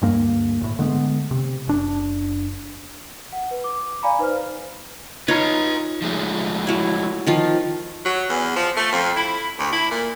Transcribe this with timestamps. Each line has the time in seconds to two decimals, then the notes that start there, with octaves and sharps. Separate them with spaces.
0.02 D2 G2 A#3
0.61 G#1 A2
0.79 D3 G#3 A3 B3
1.31 C3
1.67 F#1 D4
3.33 F#5
3.51 B4
3.64 D6
4.03 D5 F5 G#5 A#5 B5
4.19 D#4 B4 C5 F6
5.28 D#4 F4 B4 C#5 A#5
6.02 F3 G#3 A3
6.67 F#3 E4
7.27 D#3 F3 F4
8.05 F#3
8.29 E2
8.56 F3
8.76 A3
8.92 F2
9.16 E4
9.59 D2
9.73 E4
9.91 A#2